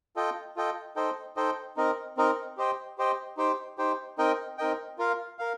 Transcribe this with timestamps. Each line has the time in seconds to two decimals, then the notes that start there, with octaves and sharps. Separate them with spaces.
0.16 F4 A4 D#5 G5
0.56 F4 A4 D#5 G5
0.96 D#4 A4 C5 D#5 G5
1.36 D#4 A4 C5 D#5 G5
1.76 C4 D#4 A#4 D#5
2.17 C4 D#4 A#4 D#5
2.57 G4 C5 D#5 G5
2.98 G4 C5 D#5 G5
3.37 D#4 G4 C5 G5
3.78 D#4 G4 C5 G5
4.18 C4 D#4 A#4 D#5 G5
4.58 C4 D#4 A#4 D#5 G5
4.98 F4 A#4 F5
5.39 A#4 F5